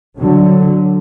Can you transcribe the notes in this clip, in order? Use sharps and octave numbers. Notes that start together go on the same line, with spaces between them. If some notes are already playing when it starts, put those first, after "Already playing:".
D3 F#3